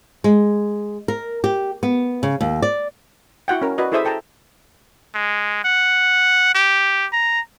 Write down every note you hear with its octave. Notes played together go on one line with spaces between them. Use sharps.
G#3
A#4
G4
B3
C#3
D#2
D5
E4 F#4 F#5 G5
C#4 A#4
F#4 B4 D5 D#5
E4 G#4 A4 C5 E5 D#6
A4 G5 A5 A#5
G#3
F#5
G4
A#5